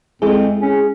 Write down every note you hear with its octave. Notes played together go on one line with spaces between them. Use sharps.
F2 G#3 E4 G#4
C#4